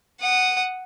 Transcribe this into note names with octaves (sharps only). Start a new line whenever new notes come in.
F#5 D#6